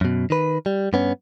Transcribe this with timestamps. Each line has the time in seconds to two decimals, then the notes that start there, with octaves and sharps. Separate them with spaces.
0.01 F#2 B2
0.30 D#3 B4
0.66 G3
0.93 G2 B3 C#4